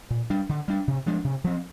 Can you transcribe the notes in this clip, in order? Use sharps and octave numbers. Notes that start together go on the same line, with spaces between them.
A#2
G3 D4
D3
G3 D4
C3
F3 G#3 D4
C3
F3 C4